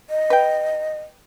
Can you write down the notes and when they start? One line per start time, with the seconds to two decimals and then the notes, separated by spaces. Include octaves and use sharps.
0.10 D#5
0.30 B4 G5